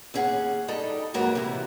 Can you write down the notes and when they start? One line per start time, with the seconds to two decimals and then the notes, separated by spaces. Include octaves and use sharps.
0.14 D#2 C#4 G#4 F#5
0.68 G3 D#4 A4
1.14 F2 G#2 F#3 A#3 B4 A#5
1.35 C3 E3